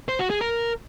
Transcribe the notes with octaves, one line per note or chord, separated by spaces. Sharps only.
C5
F#4
G#4
A#4